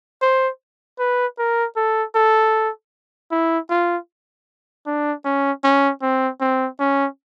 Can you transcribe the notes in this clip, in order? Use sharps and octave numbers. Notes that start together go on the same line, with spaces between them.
C5
B4
A#4
A4
A4
E4
F4
D4
C#4
C#4
C4
C4
C#4